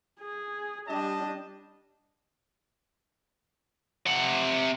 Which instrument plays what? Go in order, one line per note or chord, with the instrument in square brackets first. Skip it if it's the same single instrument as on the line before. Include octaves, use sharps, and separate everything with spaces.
[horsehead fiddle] G#4
[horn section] G3 D#5 A5 [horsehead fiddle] D4 G4
[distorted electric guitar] C3 F#5